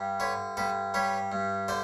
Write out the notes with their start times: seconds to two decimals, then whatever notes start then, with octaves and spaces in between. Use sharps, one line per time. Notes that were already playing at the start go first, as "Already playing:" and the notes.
Already playing: G2 G3
0.20 D3 B4 C#5
0.57 G2 A4 B4
0.94 G3 B4 C#5
1.32 G2
1.68 D3 C5 D5